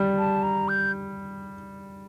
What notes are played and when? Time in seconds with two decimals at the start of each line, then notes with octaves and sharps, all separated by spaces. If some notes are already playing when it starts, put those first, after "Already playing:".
Already playing: G3
0.18 A5
0.43 A#5
0.68 G6